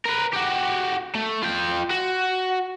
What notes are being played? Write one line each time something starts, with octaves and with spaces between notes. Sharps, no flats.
A#4 B4
F#4 G4
A3
F4 G5
F#4